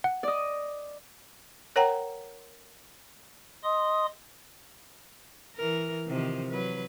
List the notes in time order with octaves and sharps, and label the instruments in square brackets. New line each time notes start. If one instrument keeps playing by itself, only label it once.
[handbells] F#5
[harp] D5 D#5
[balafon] A#4 C#5 F#5 G5 A#5
[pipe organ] D#5 C6 D#6
[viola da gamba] E3 A#4
C3 D#3 F3
F#3 B4